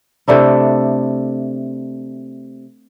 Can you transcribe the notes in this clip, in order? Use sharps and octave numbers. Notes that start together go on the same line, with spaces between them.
C3 A3 D4 E4